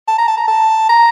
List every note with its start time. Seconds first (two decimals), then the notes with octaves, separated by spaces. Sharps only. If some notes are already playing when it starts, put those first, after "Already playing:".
0.08 A5
0.18 A#5
0.28 A5
0.38 A#5
0.48 A5
0.89 A#5